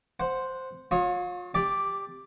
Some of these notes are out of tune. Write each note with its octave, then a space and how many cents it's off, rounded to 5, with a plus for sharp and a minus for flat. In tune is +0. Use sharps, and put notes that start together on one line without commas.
C5 +0 F#5 -10
F4 +35 C#5 +0 D#6 +30
G4 +15 D5 +0